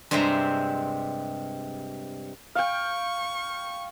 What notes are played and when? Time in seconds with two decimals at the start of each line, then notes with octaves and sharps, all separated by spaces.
0.11 G2 C3 G#3 C4 E5 A#5
2.55 F5 G5 C#6